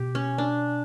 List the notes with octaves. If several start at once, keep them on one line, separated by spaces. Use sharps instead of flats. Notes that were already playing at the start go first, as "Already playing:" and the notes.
Already playing: B2 G4
C#4
D4